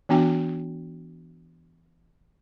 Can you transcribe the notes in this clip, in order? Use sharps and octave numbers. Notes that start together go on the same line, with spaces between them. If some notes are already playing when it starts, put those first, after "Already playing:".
E3 B3 D4 F#4 G5